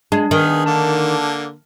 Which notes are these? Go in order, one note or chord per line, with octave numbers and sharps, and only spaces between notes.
G#3 D4
D#3 B3 G#4
D3 A#3 A5